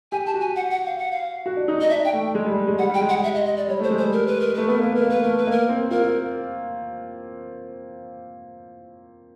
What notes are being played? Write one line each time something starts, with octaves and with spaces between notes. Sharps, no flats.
G4 G#5
A5
F#4
G#5
F#5
F#5
F5
F#5
F5
F#4
D4
D#4
D#4 D#5
D4 E5
G5
A3
G#3
G3
G#3
G3 F#5
G3
G5
G#3
F#5
G3
E5
D#5
D#5
D5
G3 C#5
A3
C5
G#3
C5
G3
A#4
B4
A#4
A3 B4
B3 A#4
A#3 B4
A#3
A#4
A#3
B4
A3 A#4
B4
A#3 A#4
C4
F4 A#4
F4